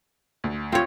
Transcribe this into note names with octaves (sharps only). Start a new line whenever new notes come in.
D2
C4 F4 G4 A4 C#5